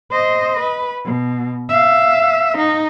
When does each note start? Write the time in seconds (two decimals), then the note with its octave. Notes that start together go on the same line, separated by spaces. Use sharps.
0.11 C5 D#5
0.60 B4
1.05 B2
1.70 E5 F5
2.58 D#4